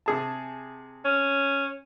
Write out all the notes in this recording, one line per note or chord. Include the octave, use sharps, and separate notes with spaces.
C3 G#4 A5
C#4